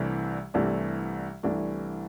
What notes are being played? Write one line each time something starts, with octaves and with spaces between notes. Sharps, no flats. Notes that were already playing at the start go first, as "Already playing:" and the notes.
Already playing: C2 C3 E3 A3 D4
C2 C3 E3 A3 D4
C2 C3 E3 A3 D4